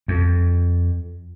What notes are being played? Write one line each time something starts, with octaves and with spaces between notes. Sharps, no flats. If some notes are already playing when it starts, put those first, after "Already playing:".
F2